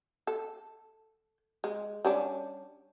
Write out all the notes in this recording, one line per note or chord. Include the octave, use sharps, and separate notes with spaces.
A4
G#3
G3 C#4 D4